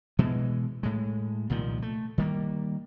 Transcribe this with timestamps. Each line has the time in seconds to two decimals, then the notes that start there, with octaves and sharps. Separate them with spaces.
0.19 B2 E3 G#3
0.83 A2 G#3
1.50 C2 A#2 D#3 F3
1.82 A3
2.18 D#3 G3 A#3